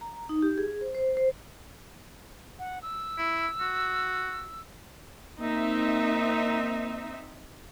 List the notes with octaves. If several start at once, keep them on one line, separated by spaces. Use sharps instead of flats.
A#5
D#4
G4
G#4
C5
C5
C5
F#5
E6
E4
F#4
A#3 C4 D#4 E5